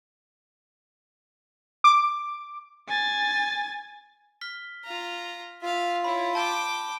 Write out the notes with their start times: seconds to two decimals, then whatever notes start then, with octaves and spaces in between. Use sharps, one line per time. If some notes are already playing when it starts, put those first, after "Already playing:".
1.84 D6
2.89 G#5 A6
4.41 F6 B6 G7
4.85 F4 A#5
5.63 F4 E5 F5
6.04 E4 C#5 B5
6.35 G5 A5 D6 G6 E7